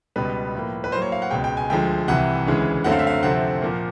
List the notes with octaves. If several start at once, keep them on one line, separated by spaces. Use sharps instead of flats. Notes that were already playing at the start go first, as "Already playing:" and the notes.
C#2 B2 G3 B3 B4
A2 F3 A#3
B4
A2 F#3 A#3 C5
C#5
F5
F#5
C#2 B2 G#3 G5
G5
G#5
D2 D3 F3 G#3 G5
C2 C3 E3 F#5
D2 C#3 E3 G#3
F#2 D3 F#3 A3 C4 F#5
F5
E5
F5
D2 C3 F3 A3 C4 F#5
A#2 F3 A#3